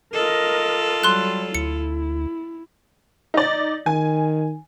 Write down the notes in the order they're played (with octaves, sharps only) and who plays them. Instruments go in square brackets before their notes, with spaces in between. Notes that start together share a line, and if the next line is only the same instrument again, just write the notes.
[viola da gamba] F4 A4 [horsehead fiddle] A#4 D#5
[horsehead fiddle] F#3 G3 [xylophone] C6 F#6
[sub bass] D2 [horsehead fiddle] E4 [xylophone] C#7
[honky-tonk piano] D#4 D5
[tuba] D#3 [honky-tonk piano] G#5